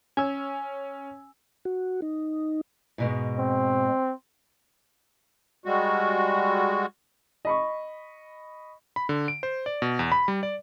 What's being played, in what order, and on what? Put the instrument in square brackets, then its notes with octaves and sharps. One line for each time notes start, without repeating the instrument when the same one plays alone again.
[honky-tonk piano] C#4 [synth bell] G#5 E6
[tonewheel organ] F#4
D#4
[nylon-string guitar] G#2 B2 G#3
[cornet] C4
[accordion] G3 G#3 F#4
[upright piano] D#5 B5 C#6
[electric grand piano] B5
D3
D7
C5
D5
B2
E2
B5
G3
D5